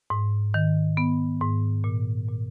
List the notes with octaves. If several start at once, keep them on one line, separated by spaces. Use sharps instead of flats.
G#2
D#3
B3
G#2
A#2
A#2